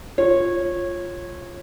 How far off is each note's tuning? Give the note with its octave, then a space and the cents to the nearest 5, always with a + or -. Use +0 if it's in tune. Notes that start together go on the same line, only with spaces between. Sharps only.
F4 +0 C#5 -20